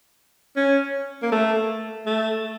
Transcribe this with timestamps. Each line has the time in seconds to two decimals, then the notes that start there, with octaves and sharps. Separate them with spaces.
0.57 C#4
1.22 A#3
1.32 A3
2.06 A3